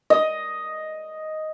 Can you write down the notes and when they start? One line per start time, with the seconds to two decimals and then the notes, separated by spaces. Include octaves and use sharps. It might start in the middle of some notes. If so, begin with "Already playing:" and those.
0.10 D#5